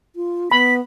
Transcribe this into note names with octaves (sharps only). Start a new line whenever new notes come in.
F4
B3 B5 B6